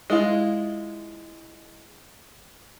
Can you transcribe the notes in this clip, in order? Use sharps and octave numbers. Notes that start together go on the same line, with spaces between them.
G#3 E4 F4